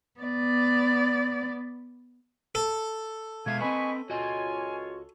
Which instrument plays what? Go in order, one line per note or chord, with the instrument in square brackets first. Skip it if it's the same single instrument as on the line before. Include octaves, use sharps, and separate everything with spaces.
[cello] B3 D5
[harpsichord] A4
[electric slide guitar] B2 G#3 E5 [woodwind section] F5 [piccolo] G#6
[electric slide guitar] C4 B4 [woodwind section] D#5 B5 C#6 [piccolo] G#5
[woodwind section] C#2 F4 C#5 [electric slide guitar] F#4 D#5 [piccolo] G#5